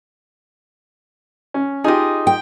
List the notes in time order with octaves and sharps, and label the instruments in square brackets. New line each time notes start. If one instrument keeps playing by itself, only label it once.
[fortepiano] C#4
[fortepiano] D#4 F4 G4 [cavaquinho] G#4 D#5
[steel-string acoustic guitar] G5